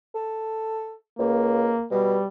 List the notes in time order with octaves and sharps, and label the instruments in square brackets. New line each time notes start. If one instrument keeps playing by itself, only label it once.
[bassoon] A4
[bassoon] C#2 [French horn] A#3
[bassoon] B2 [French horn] G3